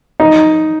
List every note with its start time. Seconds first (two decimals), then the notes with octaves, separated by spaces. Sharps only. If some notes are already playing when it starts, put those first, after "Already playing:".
0.20 D#4